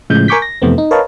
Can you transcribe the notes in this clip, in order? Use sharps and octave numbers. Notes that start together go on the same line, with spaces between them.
A2 C#3 F3 G#3 G6
A#4 G#5 C#6 D6 G6 B6
A#6
F2 C3 E3 A3 B3 C4
D#4
A#4 B4 C#5 D#5 F5 A5